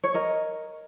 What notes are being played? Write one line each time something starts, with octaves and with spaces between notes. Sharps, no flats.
C#5
A#4 D#5